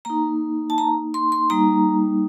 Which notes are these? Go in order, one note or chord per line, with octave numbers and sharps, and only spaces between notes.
A#3 D#4 A#5
A5
A#5
C6
C6
G3 A#3 D#4 A#5